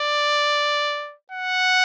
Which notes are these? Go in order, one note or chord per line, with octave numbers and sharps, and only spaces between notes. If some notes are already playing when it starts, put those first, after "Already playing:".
Already playing: D5
F#5